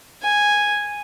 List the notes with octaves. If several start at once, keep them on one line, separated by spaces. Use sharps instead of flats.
G#5